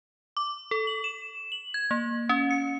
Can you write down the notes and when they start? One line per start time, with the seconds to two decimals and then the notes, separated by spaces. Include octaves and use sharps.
0.37 D6
0.71 A4
0.87 F#7
1.04 E7
1.52 F#7
1.74 G#6
1.91 A#3
2.29 C#4
2.51 C#7